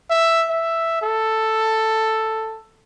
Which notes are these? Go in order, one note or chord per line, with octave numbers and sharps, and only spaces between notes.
E5
E5
A4